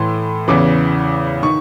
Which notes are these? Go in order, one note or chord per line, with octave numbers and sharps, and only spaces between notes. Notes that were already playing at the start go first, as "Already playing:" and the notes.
Already playing: A2 E3 C6
E2 C#3 E3 D6
D#3 C#6